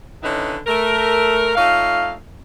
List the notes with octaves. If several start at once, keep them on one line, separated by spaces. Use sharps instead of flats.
D3 D#3 C#4 D#4 E4 B4
A3 A#4
A3 D#4 F4 C#5 F5